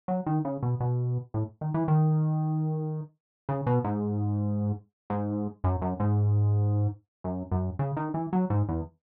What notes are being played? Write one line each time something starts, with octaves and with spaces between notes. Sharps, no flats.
F#3
D#3
C#3
B2
B2
A2
D#3
E3
D#3
C#3
B2
G#2
G#2
F#2
F#2
G#2
F#2
F#2
C#3
D#3
E3
F#3
G#2
E2